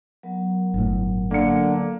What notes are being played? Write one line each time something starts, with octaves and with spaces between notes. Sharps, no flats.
F#3 B3 A#4
G1 A2
D3 A#3 C#7